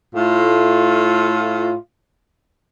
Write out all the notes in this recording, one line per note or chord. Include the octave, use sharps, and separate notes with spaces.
A2 A3 F4